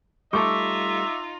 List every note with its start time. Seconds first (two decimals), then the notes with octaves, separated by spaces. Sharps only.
0.33 G3 A3 D#4 F4 A4 E5 C#6 D6